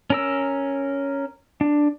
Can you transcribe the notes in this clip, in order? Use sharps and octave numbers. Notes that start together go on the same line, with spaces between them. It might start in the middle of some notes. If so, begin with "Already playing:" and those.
C#4 A#4 E6
D4